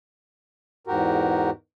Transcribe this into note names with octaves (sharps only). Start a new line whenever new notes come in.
E2 G#2 F#4 G4 A#4